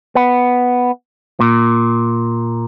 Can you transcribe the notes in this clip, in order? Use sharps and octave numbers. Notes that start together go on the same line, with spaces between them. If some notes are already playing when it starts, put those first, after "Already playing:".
B3
A#2